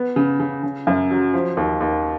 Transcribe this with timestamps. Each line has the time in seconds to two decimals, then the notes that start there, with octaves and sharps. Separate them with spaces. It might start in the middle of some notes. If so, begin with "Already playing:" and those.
Already playing: B3
0.16 C#3
0.40 C#3
0.63 C#3
0.87 F#2
1.11 F#3
1.34 F3
1.57 D#2
1.81 D#2